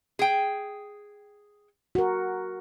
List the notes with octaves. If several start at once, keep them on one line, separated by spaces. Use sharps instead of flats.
G#4 G5
F#4 A#4